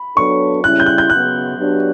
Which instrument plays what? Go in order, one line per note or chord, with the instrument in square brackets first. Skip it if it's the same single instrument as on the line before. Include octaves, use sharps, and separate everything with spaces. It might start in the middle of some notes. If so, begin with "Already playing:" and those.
Already playing: [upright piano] B5
[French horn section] F#3 B3 D4 A4 C#5 [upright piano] C#6
[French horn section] C#3 G3 C#4 E4 [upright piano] F#6
[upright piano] G6
F#6
G6
[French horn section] C#3 F#3 B3 [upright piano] F#6
[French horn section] F#3 B3 D4 G4 C#5